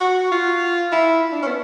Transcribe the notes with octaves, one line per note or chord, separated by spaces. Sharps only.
F#4
F4
E4
D4
C#4
B3